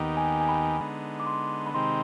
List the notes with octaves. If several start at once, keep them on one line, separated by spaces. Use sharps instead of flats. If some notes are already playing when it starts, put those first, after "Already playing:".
Already playing: D#2 D#3 B3 D#4 G4
G#5
G#5
B5
D3 G#3 B3 D#4
D6
C6
B5
C3 D#3 G#3 C4 D#4 C6